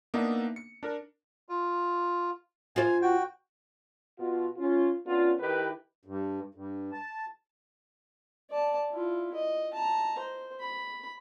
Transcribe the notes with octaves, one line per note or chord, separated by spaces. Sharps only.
A#3 B3 D4 D#4 E5
C#7
D4 A#4
F4
F4 C5 G#5
F#4 G5
B2 F4
C#4 F4
B3 C#4 D4 F4
D#3 E4 G4 B4
G2
G2
A5
D5 A5
E4 F4
D#5
A5 A#5
C5
B5